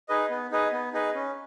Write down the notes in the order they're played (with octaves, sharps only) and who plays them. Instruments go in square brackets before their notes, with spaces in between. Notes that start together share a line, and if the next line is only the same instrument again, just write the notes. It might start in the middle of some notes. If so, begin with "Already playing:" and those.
[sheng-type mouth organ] D#4 G#4 B4 D#5
B3
D#4 G#4 B4 D#5
B3
D#4 G#4 B4 D#5
C#4